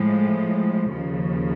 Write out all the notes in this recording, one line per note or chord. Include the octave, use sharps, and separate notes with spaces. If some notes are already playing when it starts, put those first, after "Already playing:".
Already playing: A2 F3 G#3
D#2 C#3 F3